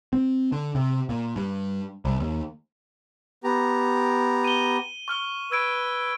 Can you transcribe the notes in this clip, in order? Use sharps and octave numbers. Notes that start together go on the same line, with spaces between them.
C4
D3
C3
A#2
G2
C2
D#2
B3 G4 A#5
D#7 G7
C#6 F6 G7
B4 E6 G#6 D7